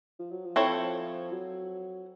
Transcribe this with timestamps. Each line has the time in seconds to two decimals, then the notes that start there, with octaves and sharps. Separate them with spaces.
0.19 F3
0.31 F#3
0.45 F3
0.56 F3 C4 E4 A4 C#5
1.32 F#3